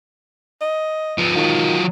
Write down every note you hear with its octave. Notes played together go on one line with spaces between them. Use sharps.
D#5
F3 B3
D#3 F#3 F4